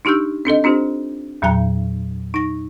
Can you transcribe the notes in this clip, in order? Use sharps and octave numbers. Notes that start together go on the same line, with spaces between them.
D4 D#4 G4 E6 G6
C4 D4 A4 D#5
C4 D4 F4 G4 C5
E2 A#2 F#3 G5 A#5
D#4 A#6